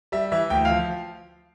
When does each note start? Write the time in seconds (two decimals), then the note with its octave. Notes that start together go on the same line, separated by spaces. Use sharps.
0.12 G3 E5
0.32 E3 E5
0.50 D2 G5
0.65 F3 F5